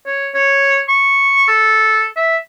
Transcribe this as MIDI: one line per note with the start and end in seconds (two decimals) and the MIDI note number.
0.06 0.29 73
0.34 0.80 73
0.88 1.46 85
1.48 2.05 69
2.16 2.37 76